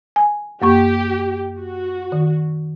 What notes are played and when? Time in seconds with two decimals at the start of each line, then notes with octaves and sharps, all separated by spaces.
0.16 G#5
0.62 F#2 A#3 G4 C#6
1.60 F#4
2.12 D#3